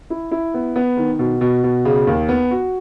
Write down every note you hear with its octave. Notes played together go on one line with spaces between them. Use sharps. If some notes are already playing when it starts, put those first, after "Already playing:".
E4
E4
B3
B3
D#3
B2
B2
B2
C#3
D#2
B3
F#4